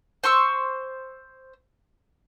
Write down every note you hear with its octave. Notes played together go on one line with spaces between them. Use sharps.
C5 C6 C#6 E6